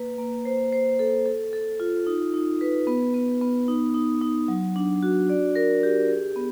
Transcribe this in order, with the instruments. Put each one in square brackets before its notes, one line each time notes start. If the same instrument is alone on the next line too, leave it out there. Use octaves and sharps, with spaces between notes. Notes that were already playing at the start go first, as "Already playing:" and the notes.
Already playing: [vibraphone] A#3 B4
A#3
C5
C5
A4
A4
A4
F4
D#4
D#4
B4
B3
B3
B3
D#4
D#4
D#4
F#3
D4
F#4
D5
A#4
G4
G#4
B3